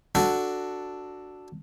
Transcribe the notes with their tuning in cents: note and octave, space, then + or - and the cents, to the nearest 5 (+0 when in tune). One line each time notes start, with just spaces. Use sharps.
D4 +0 F#4 +0 A4 +0